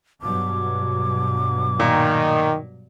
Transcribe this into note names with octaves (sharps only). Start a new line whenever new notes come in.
G2 B2 F#3 D6
A#2 D#3